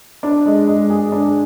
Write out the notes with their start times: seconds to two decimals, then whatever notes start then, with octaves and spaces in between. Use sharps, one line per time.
0.23 D4
0.46 G#3
0.67 G#3
0.90 G#4
1.12 D4